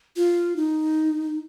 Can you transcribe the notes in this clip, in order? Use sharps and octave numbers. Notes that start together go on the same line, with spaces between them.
F4
D#4